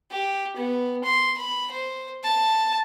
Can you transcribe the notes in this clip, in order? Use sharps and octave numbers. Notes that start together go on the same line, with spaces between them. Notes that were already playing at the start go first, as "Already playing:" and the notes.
G4
B3
C6
B5
C5
A5